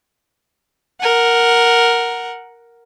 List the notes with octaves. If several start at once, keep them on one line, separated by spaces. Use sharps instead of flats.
A#4 F#5